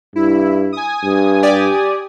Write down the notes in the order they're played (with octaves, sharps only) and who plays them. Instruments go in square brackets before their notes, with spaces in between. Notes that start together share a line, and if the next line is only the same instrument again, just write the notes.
[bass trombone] G2 [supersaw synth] E4
[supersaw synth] G#5 D#6
[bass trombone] G2
[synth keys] G4 D5